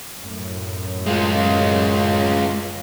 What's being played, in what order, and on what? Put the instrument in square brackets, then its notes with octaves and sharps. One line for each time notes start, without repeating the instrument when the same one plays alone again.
[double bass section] F#2 A2
[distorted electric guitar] G#3 F4